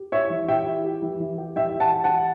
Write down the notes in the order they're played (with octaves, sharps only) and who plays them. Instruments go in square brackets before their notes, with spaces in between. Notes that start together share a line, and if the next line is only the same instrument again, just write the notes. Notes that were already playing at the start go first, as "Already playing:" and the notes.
Already playing: [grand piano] G4
[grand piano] E4 [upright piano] C#5 E5
[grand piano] E3
[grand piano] G4 [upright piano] E5 G5
[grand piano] E4
G4
E3
E3
G4
[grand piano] E3 [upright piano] E5 G5
[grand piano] E3
[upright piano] F#5 A5
[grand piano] G4
[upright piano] F#5 A5
[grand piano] G4